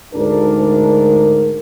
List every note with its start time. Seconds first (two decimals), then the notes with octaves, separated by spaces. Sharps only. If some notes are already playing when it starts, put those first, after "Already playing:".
0.14 D2 G#2 D4 A#4